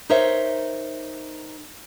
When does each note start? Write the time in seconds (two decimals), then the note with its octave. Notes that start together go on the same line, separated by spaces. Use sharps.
0.09 D#4 A#4 C5 C#5 E5